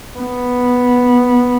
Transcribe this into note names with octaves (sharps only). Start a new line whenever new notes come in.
B3